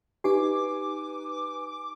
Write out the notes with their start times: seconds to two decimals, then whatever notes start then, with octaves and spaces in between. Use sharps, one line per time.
0.24 D#4 G4 B4 G#5 D6